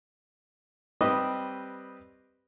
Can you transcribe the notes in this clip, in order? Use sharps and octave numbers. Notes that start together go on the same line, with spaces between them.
G3 C4 G4 B4 D#5